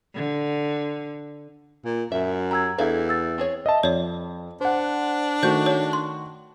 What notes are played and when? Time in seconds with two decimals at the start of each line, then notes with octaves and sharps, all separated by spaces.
0.14 D3
1.85 A#2
2.12 F#2 E5
2.51 G4 A#5 E6 G#6
2.78 E2 D4 A4 D5 E5 F5
3.09 E6 A6
3.38 C4 G#4 C#5
3.66 D#5 E5 A5
3.83 F2 C#5 D5
4.61 D4 C5 F#5
5.43 D#3 A3 F#4 C5 G6
5.66 C#5
5.93 C6